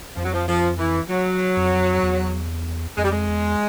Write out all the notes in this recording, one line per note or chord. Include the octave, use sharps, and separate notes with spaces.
F2 F3
F#3
F3
F3
E3
F#3
F2
E2
F2 G#3
G3
G#3
E2